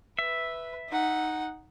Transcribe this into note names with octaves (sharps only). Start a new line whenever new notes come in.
B4 E5
D#4 F#5